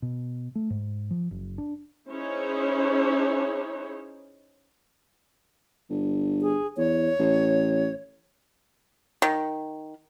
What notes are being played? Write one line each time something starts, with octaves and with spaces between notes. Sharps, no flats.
B2
A3
G#2
F3
F#1
D4
C#4 D#4 E4 G#4 C5 C#5
G1
G#4
E2 C#5
A1
D#3